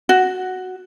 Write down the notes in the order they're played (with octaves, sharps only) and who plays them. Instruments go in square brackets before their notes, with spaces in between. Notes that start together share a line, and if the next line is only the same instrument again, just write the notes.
[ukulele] F#4